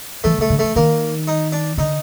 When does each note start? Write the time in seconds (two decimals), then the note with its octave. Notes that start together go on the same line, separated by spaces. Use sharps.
0.24 E3 A3
0.38 D#3 A3
0.50 D3
0.59 E3 A3
0.76 D#3 A#3
1.28 D#4
1.52 D4
1.77 D3 D#4